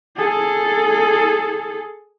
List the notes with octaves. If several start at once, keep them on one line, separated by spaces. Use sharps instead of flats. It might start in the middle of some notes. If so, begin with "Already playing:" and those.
G#4 A4